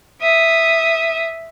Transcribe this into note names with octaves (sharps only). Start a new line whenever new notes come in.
E5 D#6